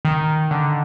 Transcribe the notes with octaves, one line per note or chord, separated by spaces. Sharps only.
D#3
D3